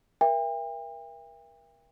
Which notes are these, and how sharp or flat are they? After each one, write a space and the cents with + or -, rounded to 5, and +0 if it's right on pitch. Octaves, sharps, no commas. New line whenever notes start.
A#4 +30 E5 +25 G5 +35